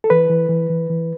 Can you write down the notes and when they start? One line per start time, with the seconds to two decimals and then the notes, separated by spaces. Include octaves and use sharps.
0.04 A4
0.10 E3 B4
0.30 E3
0.49 E3
0.70 E3
0.90 E3